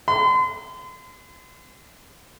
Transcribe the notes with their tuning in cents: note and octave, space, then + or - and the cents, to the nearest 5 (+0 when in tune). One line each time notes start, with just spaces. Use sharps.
C6 -40